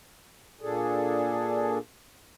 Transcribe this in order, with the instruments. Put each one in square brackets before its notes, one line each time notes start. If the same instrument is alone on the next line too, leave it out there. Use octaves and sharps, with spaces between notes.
[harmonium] A#2 D4 G#4 A4